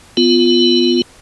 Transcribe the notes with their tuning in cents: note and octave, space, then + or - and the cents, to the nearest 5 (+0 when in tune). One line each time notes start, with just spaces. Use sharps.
B3 +20 F4 +0